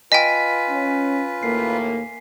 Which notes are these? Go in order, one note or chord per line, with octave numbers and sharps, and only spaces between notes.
F4 B4 D#5 G5 G#5 B6 D#7
C#4
D#2 A2 A#3 C7